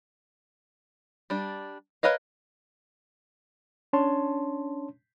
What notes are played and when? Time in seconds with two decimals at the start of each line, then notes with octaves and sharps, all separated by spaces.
1.30 G3 D4
2.03 A#4 B4 C#5 D#5 F5
3.93 C#4 D4 C#5 A5 C6